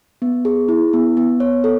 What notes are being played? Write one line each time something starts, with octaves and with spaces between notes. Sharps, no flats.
B3
G#4
E4
B3
B3
C#5
A4